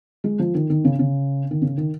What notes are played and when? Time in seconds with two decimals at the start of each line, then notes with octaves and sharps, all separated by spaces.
0.24 G#3
0.39 F3
0.55 D#3
0.70 D#3
0.85 C#3
0.99 C#3
1.51 D#3
1.62 C#3
1.78 D#3